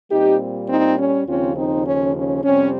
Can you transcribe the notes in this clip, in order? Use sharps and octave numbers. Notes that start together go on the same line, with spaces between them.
A#2 G3 C4 D#4 G4
C4 D#4
C#4
D#2 C#3 F3 C4 C#4 F4
C4 D#4
C#4
C#4
F2 C3 G3 C4 C#4